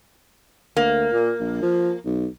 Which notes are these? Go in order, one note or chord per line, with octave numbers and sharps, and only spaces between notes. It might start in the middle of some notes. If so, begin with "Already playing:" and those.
D2 A#3
A#2
A#1
F3
B1